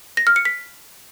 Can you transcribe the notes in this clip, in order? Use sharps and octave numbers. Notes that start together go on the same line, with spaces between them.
A#6
F6
C#7
B6